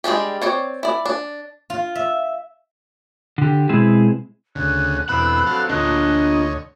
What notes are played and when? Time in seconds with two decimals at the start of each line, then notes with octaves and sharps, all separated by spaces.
0.04 G3 G#3 D4 G4
0.42 C4 C#5 D5
0.83 E4 D5
1.06 D4
1.70 F4
1.95 E5
3.38 D3 G4
3.69 B2 G#3 C4 E4 G#4
4.55 D2 C#3 F#6
5.09 E2 B2 D3 B3 C4 B5 E6
5.46 F#3 A4 F5
5.69 D2 D4 F4 C#5 D#5